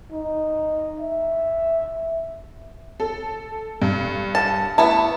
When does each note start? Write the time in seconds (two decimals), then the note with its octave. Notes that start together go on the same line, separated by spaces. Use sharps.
0.12 D#4
1.00 E5
3.00 A4
3.82 G2
4.35 A5
4.78 A3 B3 E4 A5